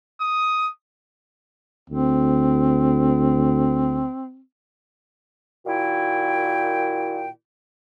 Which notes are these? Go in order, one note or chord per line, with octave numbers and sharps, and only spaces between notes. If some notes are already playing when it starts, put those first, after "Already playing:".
D#6
D2 C4
A#2 D#3 E4 F#4 G5